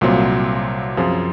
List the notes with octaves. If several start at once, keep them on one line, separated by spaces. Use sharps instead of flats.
C2 A#2 F#3 C4 F4
F#2 F3 C4 F4 G#4